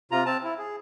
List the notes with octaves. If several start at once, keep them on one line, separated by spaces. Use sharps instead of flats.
C3 F4 A#5
C4 A5
E4
G#4